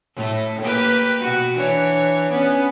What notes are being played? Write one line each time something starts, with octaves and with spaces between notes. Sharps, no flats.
A2 A3
A#3 G4 B4
B2 F#4
E3 D4 C#5
B3 C#4